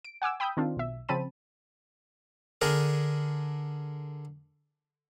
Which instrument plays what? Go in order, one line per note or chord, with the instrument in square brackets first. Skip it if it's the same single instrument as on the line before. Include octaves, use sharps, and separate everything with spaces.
[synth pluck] D7
F#5 G#5 D6 E6
G5 B5 D#6 E6 G6
D#3 C4 D4 F4
B1 E5
C#3 F3 C4 A5 B5 D#7
[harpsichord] D3 D4 G#4 A#4